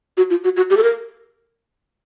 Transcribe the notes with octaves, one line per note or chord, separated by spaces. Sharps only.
F#4
F4
F#4
F#4
G4
A4
A#4